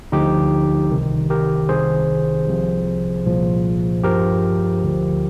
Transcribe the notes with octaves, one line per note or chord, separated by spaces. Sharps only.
D2 D3 F3 D#4 G4
C2 C3 D#3
G4 A#4
C2 C3 D#3 G#4 C5
C2 C3 F3
C2 A#2 F3
G2 F3 G4 A#4
D2 D3 F3